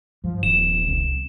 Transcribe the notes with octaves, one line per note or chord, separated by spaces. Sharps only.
G2 F3
D#1 F3 B3 E7
C2 C3